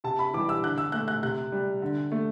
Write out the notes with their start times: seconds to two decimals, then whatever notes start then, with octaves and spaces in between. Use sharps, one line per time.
0.04 C3 A5
0.19 B5
0.34 E3 G3 D6
0.49 E6
0.64 D3 F#6
0.78 E6
0.92 A3 F#6
1.08 F#6
1.23 C3 F#6
1.52 G3
1.82 D3
2.11 A3